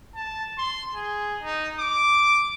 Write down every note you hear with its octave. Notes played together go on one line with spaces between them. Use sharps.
A5
C6
G#4
D#4
D6